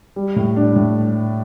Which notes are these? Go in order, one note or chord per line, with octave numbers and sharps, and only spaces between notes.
G3
A2
D4
A2